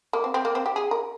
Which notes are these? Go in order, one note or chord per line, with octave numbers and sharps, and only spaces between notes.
A#3
C4
C4
A#3
C4
G4
G#4
A#4